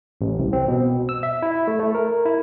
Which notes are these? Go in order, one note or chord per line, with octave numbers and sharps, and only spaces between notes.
A1
C2
C4
B2
E6
E5
E4
A3
A3
A#4
E4